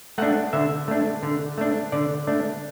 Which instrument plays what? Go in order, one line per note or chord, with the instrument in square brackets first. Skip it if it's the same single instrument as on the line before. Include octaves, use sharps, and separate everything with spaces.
[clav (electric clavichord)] A3 D4 F#5
D3 E5
A3 D4
D3
A3 D4
D3 D5
A3 D4